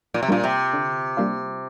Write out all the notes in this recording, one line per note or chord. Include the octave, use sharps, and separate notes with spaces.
A#2
C3
A#2 G3 A#3 D4 F4
C3
D3
G3 A#3 D4 F4